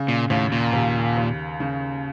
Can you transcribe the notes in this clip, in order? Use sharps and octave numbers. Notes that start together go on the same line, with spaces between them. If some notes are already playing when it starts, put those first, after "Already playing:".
Already playing: C#3
A#2
D#2 A2
A#2
D#2
D#2
C#3